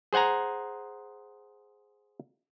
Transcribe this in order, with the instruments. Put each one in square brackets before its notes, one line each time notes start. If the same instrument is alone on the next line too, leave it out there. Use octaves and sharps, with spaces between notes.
[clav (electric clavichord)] G#4 C5 F#5 G#5 A#5